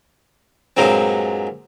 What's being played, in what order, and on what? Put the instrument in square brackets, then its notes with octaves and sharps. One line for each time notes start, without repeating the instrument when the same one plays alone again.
[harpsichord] G2 A#2 F#3 G#3 C4